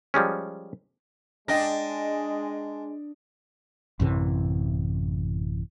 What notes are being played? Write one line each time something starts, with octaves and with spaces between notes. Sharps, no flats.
F3 G3 G#3 C#4
G#3 D4 D#5 G5 A#6
A1 F#2 C3 E3